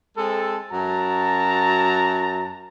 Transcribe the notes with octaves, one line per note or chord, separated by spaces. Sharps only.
G#3 C4 A4
F#2 F#4 A5 A#5